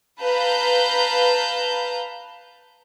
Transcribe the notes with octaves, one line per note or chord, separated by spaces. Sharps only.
B4 F5 A5 A#5 G6